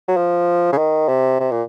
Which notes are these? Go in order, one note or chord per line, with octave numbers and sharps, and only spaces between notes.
F#3
F3
C#3
D#3
C3
C3
A#2